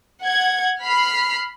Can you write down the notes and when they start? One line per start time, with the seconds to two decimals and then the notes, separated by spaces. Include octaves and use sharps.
0.23 F#5 G#6
0.83 B5 F6 C7